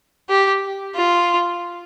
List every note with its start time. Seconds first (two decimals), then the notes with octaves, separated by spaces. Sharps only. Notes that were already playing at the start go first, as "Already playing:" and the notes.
0.29 G4
0.95 F4